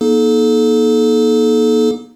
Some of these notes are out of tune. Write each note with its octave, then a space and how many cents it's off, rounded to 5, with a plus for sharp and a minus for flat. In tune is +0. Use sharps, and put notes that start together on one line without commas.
A#3 +35 D#4 +0 A4 -35